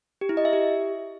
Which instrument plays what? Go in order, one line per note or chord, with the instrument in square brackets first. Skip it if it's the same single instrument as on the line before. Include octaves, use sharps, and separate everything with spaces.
[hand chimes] G4
E4
D#5
E5
G4